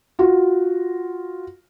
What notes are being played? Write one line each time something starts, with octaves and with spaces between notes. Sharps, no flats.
F4 F#4